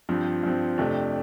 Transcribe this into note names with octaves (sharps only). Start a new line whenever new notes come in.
G2 F3 C4
G2 F3 C4
F2 C3 A3 D4